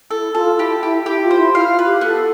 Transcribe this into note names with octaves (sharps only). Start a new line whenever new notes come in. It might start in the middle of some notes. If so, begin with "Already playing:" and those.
E4 A4
F4 A4
E4 G4
E4 G4
E4 G4
F4
C5
E4
E4 F5
F4
B4
G4
B3 A4